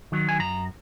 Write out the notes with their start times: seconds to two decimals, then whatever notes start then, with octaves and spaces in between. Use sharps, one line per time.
0.12 D#3 F#3
0.29 G#5
0.40 F#2 A#5